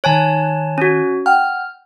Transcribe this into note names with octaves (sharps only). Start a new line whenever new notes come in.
D#3 C#5 G#5 A5 F#6
C#4 F#4
F#5 G5 F6